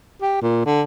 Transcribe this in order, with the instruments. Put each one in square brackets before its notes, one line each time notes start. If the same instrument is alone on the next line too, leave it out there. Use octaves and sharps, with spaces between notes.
[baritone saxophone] G4
A#2
D3